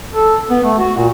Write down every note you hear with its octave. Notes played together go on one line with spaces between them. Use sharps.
A4
B3
A3
F#4
A#2